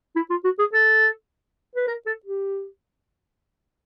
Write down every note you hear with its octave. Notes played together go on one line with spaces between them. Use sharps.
E4
F4
F#4
G#4
A4
B4
A#4
A4
G4